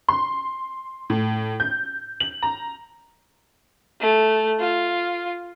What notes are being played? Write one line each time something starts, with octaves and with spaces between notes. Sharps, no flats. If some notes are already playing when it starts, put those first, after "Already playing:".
C6
A2
G6
F#7
A#5
A3
F4